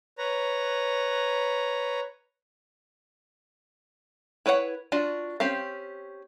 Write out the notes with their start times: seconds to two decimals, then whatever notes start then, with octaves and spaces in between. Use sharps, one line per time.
0.18 B4 C#5 A#5
4.46 E4 B4 C#5 D5 F#5
4.92 D4 F4 F#4
5.40 C4 C#4 G4 F5